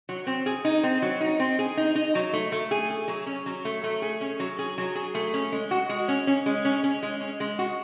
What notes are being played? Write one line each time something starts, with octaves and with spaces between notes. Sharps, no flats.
F#3
C4
G#4
D#4
C4
F#3
D#4
C4
G#4
D#4
D#4
F#3
A3
A3
G#4
G#4
F#3
C#4
F#3
A3
A3
G#4
C#4
F#3
G#4
F#3
G#4
A3
C#4
G#3
F#4
G#3
C#4
C#4
G#3
C#4
C#4
G#3
C#4
G#3
F#4